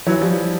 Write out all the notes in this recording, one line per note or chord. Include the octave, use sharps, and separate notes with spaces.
E3 F#3
F3 G3